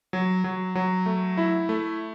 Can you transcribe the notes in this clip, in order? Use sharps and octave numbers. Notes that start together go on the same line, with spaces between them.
F#3
F#3
F#3
A3
E4
A3